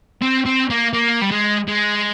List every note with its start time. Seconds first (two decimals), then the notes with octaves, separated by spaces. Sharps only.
0.22 C4
0.46 C4
0.70 A#3
0.93 A#3
1.22 G3
1.31 G#3
1.68 G#3